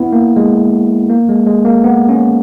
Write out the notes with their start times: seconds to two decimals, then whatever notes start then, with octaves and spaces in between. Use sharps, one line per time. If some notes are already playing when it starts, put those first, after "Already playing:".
Already playing: B3 E4
0.13 A#3
0.36 G#3
1.10 A#3
1.29 G#3
1.46 G#3
1.65 A#3
1.84 B3
2.09 C#4